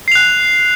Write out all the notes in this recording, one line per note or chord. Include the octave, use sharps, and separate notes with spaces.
F#6 C7 F7